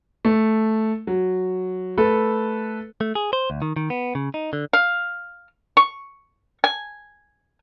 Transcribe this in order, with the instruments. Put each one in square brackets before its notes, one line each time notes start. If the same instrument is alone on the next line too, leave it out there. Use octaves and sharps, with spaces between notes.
[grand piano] A3
F#3
A3 A4 B4
[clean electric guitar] A3
G#4
C5
D2
D#3
D#3
B3
C#3
D#4
D3
[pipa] F5
C#6
G#5